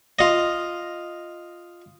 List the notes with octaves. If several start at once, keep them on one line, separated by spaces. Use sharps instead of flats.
F4 D#5